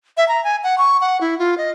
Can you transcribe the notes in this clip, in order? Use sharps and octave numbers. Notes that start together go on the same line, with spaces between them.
E5
A#5
G#5
F#5
C#6
F#5
E4
F4
D#5